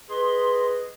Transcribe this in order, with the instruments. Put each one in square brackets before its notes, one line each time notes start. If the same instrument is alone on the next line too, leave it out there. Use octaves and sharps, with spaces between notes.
[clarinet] G#4 [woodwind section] B4 D#5 [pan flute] C6